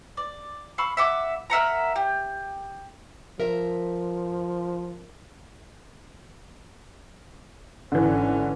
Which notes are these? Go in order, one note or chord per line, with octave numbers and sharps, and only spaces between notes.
D5
F5 B5 C#6 E6
E5 F#5 D6
A#4 E5 F#5 A#5
G4
F3 A#4 E5
G#1 D3 E3 C#4